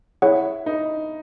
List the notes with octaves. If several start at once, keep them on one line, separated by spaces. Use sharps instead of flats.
E4 G#4 C#5 F#5
D#4